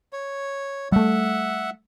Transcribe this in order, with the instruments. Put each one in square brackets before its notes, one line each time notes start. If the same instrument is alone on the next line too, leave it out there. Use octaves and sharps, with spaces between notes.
[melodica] C#5
[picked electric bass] G3 A3 [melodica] E5 F#5